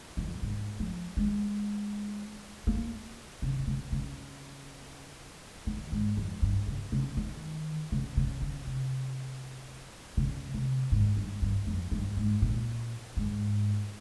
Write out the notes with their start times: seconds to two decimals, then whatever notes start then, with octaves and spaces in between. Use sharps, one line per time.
0.17 F2
0.42 G#2
0.80 F3
1.17 G#3
2.67 A#3
3.42 C#3
3.60 D#3
3.67 C#3
3.92 C#3
5.67 D#3
5.92 G#2
6.17 F2
6.42 G2
6.67 C#3
6.92 C#3
7.17 D#3
7.92 C#3
8.17 C#3
8.42 C#3
8.67 C3
10.17 C#3
10.54 C3
10.92 G#2
11.17 G2
11.42 G2
11.67 F2
11.91 G2
12.17 G#2
12.42 A#2
13.17 G#2